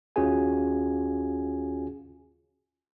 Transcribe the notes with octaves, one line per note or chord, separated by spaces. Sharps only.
D#2 C#4 F4 F#4 G#4 G#5